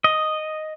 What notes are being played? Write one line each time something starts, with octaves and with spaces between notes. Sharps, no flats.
D#5